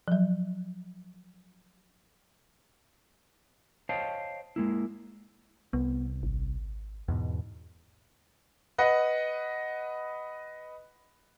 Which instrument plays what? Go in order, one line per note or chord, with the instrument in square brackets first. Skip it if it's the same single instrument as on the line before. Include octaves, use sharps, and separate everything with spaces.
[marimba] F3 F#3
[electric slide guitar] C5 C#5 D#5 F5 G5 A5
G#3 A#3 E4
[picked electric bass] C2 [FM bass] B3
[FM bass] G#1
[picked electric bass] E2 G#2 B2
[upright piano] B4 D#5 F#5